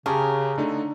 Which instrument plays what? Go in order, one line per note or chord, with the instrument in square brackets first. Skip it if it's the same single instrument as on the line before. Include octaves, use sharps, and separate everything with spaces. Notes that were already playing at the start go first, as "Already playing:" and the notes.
[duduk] C#3 [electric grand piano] C#4 G4 G#4 [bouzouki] A#4 [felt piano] A5 C#6
[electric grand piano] D3 A3 D#4 [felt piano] D4